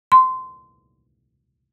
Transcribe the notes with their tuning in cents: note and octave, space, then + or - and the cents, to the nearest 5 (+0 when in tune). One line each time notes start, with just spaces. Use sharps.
C6 -20